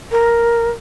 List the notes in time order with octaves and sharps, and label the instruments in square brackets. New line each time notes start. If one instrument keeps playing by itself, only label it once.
[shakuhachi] A#4